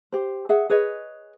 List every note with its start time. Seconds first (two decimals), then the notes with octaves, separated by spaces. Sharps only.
0.12 G4 C5
0.49 G#4 E5 F#5
0.70 G#4 B4 C#5 D#5